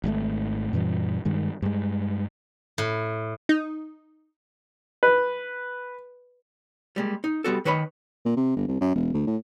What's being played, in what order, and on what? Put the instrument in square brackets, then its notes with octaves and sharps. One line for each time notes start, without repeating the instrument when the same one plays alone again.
[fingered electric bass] G#1 G#2 C3 A3
F#2 A#2 E3 G3
G2 D#3 G#3
G2 G#3
[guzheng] A2
[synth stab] D#4
[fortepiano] B4
[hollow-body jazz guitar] G3 G#3 A#3
D#4
G3 B3 F#4 A4
D#3 B4 C#5 D#5 B5
[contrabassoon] A#2
C3
G1
C2
F#2
E1
D2
A2